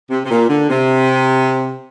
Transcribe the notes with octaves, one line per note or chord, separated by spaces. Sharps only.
C3
C3
A#2
D3
C3